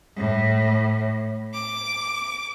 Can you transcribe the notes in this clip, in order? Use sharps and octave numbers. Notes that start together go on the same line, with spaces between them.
A2
D6